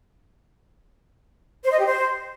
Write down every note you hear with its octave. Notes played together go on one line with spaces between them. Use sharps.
C5
D#5
G4
C5